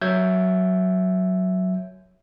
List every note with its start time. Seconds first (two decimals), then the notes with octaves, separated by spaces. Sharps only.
0.01 F#3 E5 G6 G#6